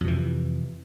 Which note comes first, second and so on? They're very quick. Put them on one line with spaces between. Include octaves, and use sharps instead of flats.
F2 C3 E3